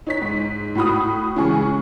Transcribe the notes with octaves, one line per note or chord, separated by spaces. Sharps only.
D#4 C#5 B6
G#2
A2 F#4 B5 D#6
C#3 E3 G#3 G#5 C#6